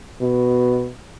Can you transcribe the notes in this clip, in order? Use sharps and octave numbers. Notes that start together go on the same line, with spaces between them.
B2